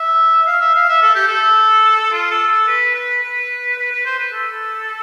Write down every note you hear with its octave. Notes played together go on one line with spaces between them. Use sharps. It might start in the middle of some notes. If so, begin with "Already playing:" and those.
Already playing: E5
F5
E5
F5
E5
A4
G4
A4
F4
A4
A4
B4
B4
B4
B4
B4
C5
B4
A4